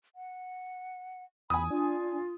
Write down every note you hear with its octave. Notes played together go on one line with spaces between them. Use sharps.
F#5
E2 G#5 B5 D#6
D4 F4